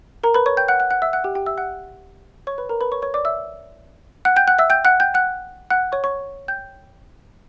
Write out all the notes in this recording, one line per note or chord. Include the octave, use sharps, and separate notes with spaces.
A#4 A#5
B4 B5
C#5 C#6
G5 G6
F#5 F#6
F#5 F#6
F#5 F#6
E5 E6
F#5 F#6
G4 G5
G4 G5
E5 E6
F#5 F#6
C#5 C#6
B4 B5
A#4 A#5
B4 B5
C#5 C#6
C#5 C#6
D5 D6
E5 E6
F#5 F#6
G5 G6
F#5 F#6
E5 E6
G5 G6
F#5 F#6
G5 G6
F#5 F#6
F#5 F#6
C#5 C#6
C#5 C#6
G5 G6